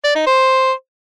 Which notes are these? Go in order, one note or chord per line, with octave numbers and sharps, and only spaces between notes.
D5
D#4
C5